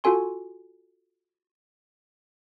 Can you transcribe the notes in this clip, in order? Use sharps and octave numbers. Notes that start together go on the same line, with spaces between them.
F4 F#4 A4 G#5 C6